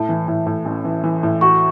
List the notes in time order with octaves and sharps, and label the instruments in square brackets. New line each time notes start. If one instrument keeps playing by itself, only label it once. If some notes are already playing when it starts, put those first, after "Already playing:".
Already playing: [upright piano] A2 [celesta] A5
[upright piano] E3
A2
A2
A1
E3
E3
A2
[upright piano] F#4 [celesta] C#6